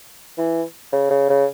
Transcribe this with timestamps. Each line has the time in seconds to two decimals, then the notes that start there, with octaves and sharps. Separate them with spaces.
0.38 E3
0.92 C#3
1.10 C#3
1.29 C#3